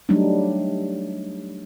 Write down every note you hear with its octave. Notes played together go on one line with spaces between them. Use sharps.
F#3 G3 A3 D4 D#4